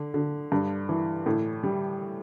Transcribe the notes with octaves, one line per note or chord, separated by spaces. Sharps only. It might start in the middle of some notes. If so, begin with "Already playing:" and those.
Already playing: D3
D3
G2
E3
A2
G3